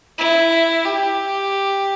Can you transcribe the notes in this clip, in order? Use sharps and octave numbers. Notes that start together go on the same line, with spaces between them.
E4
G4